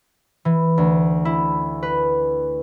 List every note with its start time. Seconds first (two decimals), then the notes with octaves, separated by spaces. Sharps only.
0.45 E3
0.78 D2
1.25 E4
1.83 B4